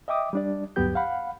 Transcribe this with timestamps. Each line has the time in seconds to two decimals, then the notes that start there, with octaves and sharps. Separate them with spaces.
0.08 D#5 E5 G5 D6 D#6
0.33 G3 D4 D5
0.76 D2 G2 F#3 B3 G4 G6
0.95 F5 F#5 B5